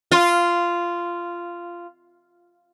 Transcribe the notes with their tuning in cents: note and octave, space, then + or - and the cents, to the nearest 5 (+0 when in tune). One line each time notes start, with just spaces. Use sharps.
F4 -10